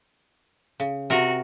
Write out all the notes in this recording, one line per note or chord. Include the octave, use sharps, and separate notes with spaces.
C#3
C3 F#4 A#4